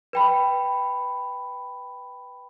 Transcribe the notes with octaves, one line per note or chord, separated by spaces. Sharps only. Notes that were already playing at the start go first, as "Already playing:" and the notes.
B4 G5 B5